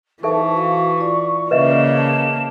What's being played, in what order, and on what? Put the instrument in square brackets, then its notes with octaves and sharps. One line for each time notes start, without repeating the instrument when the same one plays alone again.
[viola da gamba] E3 [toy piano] D#4 A4 E5 [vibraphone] B4 C5 A5 [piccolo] C#6
[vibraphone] F#4 F5
F4 D5
[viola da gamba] C#3 A#3 [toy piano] B4 D#5 E5 [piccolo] E7
[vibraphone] A5